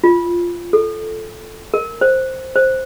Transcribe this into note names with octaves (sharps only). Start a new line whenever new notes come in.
F4
A4
A#4
C5
C5